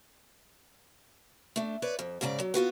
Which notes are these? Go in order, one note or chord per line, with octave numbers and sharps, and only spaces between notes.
A3 D4
B4 C#5 D5
F2
G#2 C#3 D5 G#5 A#5
F#3
B3 F4 F#4 B4